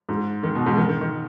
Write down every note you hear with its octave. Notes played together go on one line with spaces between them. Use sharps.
G#2
D#3
B2
G#2
D#3
D#3
D#3